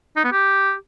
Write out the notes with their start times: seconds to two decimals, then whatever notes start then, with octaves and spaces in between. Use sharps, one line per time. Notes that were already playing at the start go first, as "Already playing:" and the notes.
0.16 D#4
0.24 B3
0.32 G4